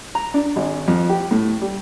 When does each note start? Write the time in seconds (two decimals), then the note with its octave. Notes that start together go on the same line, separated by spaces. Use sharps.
0.15 A#5
0.34 D4
0.56 G#1
0.88 F2
1.09 G4
1.31 A2
1.61 G3